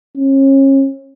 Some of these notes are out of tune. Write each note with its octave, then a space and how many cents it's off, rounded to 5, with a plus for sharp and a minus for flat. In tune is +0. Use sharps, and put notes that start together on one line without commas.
C#4 -35